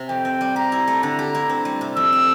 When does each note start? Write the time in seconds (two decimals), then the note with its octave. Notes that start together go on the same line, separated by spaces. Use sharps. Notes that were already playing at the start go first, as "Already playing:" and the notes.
Already playing: C3
0.09 F2 G5
0.25 C4
0.41 G3
0.56 G4 A#5
0.72 E4
0.87 A3
1.03 D3 A#5
1.19 G4
1.35 E4
1.49 C4
1.65 G3
1.81 C3
1.97 F2 E6
2.13 C4